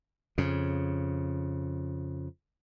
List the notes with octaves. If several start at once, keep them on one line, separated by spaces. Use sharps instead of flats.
F2 C#3